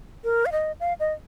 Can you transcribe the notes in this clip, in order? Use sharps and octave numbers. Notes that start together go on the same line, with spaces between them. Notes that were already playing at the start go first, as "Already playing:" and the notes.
A#4
F5
D#5
F5
D#5